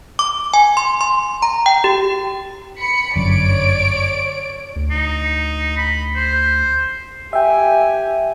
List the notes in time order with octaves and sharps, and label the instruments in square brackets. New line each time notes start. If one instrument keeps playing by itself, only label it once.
[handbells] D6
G#5
C6
C6
A#5
G5
G4
[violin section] B5 C#7
[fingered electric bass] G1 F#2 D3 [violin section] C#5 D5 D7
[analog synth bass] D2
[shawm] D#4
B5
C5
[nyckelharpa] G4 G#5 [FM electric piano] E5 G5